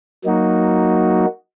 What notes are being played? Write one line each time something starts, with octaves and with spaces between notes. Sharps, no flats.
F#3 A#3 D#4 F#4